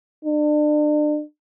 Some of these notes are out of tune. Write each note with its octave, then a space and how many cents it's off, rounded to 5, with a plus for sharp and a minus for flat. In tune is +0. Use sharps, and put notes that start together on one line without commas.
D4 +35